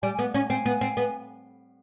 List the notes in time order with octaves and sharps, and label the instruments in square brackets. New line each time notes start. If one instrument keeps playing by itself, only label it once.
[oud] G3 [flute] G#5
[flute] G#5
[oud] B3
C#4
[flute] G#5
[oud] C4 [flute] G#5
[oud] B3
C4
B3